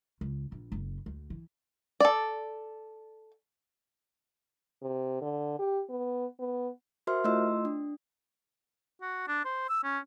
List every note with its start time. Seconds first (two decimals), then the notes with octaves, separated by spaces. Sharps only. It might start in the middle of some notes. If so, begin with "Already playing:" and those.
0.21 C#2
0.52 A#1
0.72 F#1
1.06 D2
1.30 E3
2.00 A4 D5
4.82 C3
5.21 D3
5.59 G4
5.89 B3
6.39 B3
7.07 F#4 A#4 C5 E5 C6 F6
7.24 A3 E4 F4 D#5 C6 E6
7.65 D4
9.01 F#4
9.28 D4
9.44 C5
9.69 E6
9.83 C#4